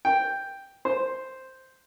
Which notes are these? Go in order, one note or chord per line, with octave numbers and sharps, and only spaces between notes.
G5
C5